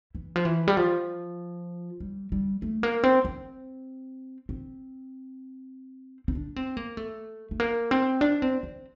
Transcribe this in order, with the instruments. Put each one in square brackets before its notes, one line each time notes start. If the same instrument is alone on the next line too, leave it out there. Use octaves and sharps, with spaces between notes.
[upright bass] E3
F3
E3
G3
F3
G3
G3
A3
A#3
C4
C4
C4
C4
D4
C4
A#3
A3
A3
A#3
C4
D4
C4
C4